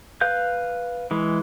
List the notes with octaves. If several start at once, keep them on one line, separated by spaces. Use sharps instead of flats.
B4 F5 G6
E3 G#3